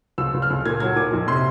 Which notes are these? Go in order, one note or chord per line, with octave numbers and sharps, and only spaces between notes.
C#2 E6
C#2
F6
C#2
A#2 G#6
F#3 G#6
A#2 D6
F2
C3 C6